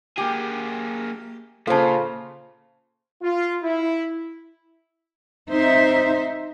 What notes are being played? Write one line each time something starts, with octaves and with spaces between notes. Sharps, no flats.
A#3 G4 G#4
A#2 C#3 F4 A4 C5 A5
F4
E4
C4 D#4 C5 E5